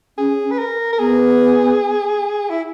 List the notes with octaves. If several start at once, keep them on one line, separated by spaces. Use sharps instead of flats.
C#4 G#4
B4
A#4
A#4
B3 G#4
E4